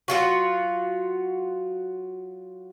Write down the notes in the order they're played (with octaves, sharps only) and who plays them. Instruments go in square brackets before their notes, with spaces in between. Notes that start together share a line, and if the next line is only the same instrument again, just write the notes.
[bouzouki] F#3 F4 F#4